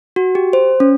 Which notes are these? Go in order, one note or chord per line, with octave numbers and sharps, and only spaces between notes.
F#4
G4
C5
C#4